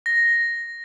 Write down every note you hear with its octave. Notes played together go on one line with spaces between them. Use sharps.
A#6